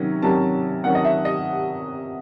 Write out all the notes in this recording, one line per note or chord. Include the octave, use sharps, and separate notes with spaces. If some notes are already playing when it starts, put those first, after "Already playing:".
Already playing: C3 D#3 F#3 C#4
C3 D#3 F#3 C#4 A5
C3 D#3 F#3 C#4 F#5
D#5
E5
D#5